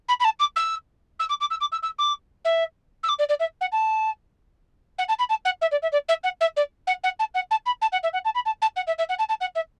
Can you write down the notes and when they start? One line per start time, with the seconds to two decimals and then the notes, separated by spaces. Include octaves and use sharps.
0.08 B5
0.20 B5
0.24 A5
0.39 D6
0.56 E6
1.19 E6
1.29 D6
1.40 D6
1.50 E6
1.60 D6
1.72 E6
1.82 E6
1.98 D6
2.44 E5
3.03 E6
3.08 D6
3.19 D5
3.29 D5
3.39 E5
3.61 F#5
3.72 A5
4.98 F#5
5.08 A5
5.19 B5
5.29 A5
5.45 F#5
5.61 E5
5.71 D5
5.82 E5
5.92 D5
6.08 E5
6.23 F#5
6.40 E5
6.56 D5
6.87 F#5
7.03 F#5
7.19 A5
7.34 F#5
7.51 A5
7.66 B5
7.81 A5
7.92 F#5
8.03 E5
8.13 F#5
8.25 A5
8.34 B5
8.45 A5
8.61 A5
8.76 F#5
8.87 E5
8.98 E5
9.09 F#5
9.19 A5
9.29 A5
9.40 F#5
9.55 E5